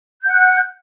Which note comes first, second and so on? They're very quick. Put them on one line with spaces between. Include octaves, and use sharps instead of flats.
G6 F#5 F#6